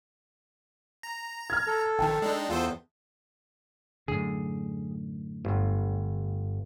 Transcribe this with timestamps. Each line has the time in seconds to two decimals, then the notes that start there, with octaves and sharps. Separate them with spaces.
1.03 A#5
1.50 F6 G#6
1.67 A4
1.99 A#1 D#3 G5 A5
2.22 G#3 D4 D#4
2.50 E2 F4 A4 C5
4.08 F#2 A2 D3 G#4
5.45 G1